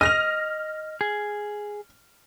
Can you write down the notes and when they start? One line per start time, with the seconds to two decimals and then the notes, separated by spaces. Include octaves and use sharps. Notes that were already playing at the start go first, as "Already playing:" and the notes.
0.01 D#5 F6 A#6 F7
1.01 G#4